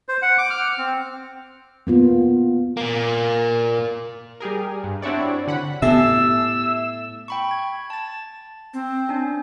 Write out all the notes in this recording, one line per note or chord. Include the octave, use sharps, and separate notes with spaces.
C5
F#5
D6
F6
C4
A#3 B3 F4
A#2 A#3
G3 G4 G#4 A#4
G2
C4 D4 E4 F#4 C#5 D5
D3 F#5 B5
A2 B3 G4 A4 E5 E6
G5 B5 C#6
G#6
A5 A6
C4
C#4 D4